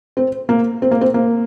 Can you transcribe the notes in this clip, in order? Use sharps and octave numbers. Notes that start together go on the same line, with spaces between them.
C4
A#3
C4
A#3
C4
A#3